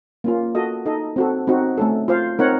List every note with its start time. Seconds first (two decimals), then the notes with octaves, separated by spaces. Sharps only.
0.24 A#3 C#4 F4
0.55 F#4 A4 D#5
0.86 D#4 A4 D#5
1.16 C4 F#4 A4
1.47 C4 D#4 F#4
1.78 A3 C#4 A4
2.08 F4 C5 F5
2.39 C4 D#4 A#4 C#5 F#5